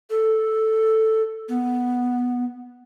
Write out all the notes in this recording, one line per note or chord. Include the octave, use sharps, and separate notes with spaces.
A4
B3